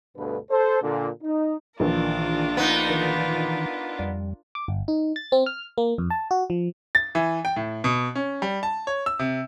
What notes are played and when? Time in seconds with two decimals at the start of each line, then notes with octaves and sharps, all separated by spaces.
0.17 D2 G2 B2 D3 A4 B4
0.51 A4 C5
0.83 A#2 D3
1.24 D#4
1.80 A#1 D#3 E3 D4 F4 A#4
2.57 B3 D#4
2.90 D#3 E3
3.99 F2 G3
4.55 D6
4.68 G1
4.88 D#4
5.16 A6
5.32 C4
5.46 F6
5.78 A#3
5.98 F2
6.10 A5
6.31 F#4
6.50 F3
6.95 A6
7.15 E3
7.45 G5
7.56 A2
7.84 B2
8.15 C#4
8.42 G3
8.63 A5
8.87 C#5
9.06 E6
9.19 C3